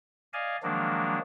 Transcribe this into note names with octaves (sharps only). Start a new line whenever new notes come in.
D5 D#5 F5 G#5
D#3 F3 F#3 G#3 A#3 D4